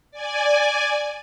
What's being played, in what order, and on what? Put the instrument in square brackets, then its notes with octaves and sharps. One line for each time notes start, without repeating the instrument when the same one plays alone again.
[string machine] D5 G#5